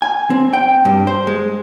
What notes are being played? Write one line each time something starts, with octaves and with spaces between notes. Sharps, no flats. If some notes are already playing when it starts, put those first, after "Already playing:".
G#5
C4
G5
G2
C5
G#3